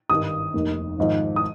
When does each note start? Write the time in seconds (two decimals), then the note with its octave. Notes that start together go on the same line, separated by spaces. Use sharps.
0.10 G#1 G2 D#3 D#6
0.54 F1 D#2 D#3
0.98 G#1 G#2 F3
1.36 D#6